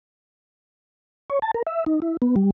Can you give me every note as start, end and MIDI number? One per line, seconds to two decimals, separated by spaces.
1.30 1.39 73
1.42 1.51 81
1.54 1.63 70
1.67 1.84 76
1.86 2.00 63
2.02 2.17 64
2.22 2.35 59
2.36 2.51 55